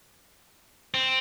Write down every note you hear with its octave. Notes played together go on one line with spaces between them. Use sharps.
C4